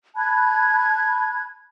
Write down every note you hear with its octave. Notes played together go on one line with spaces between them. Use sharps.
A5 B5 F#6 G#6